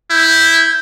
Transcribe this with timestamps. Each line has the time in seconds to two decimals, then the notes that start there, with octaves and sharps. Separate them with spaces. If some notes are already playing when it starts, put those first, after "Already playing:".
0.10 E4 G6